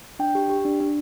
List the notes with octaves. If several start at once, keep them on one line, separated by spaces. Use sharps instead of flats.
D4 G5
G4
G4
D4
D4